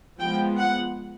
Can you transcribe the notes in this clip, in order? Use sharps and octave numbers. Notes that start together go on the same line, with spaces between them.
F3 G#3 B3 G5
F#5